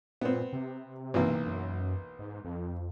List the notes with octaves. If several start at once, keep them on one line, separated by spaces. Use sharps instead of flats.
A#2 B3 C4
C3
B1 E3 A#3
F#2
G#2
F2